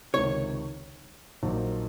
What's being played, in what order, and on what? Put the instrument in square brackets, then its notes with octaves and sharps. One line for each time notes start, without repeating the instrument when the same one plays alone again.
[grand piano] C#2 C3 D#3 [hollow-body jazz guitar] C#5
[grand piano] A#1 A#2 F#3 A#3 D#4